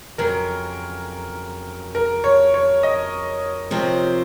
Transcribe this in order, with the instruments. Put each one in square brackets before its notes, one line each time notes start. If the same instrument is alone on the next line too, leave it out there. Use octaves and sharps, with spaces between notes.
[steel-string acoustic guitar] F2 C#3 F#3 [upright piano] A#4
[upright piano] A#4
C#5
C#5
D#5
[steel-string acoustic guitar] C3 F3 C4 F4